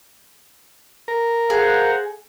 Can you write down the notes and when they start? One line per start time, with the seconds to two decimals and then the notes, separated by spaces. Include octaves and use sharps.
1.08 A#4
1.50 G#4 C5 F5 F#5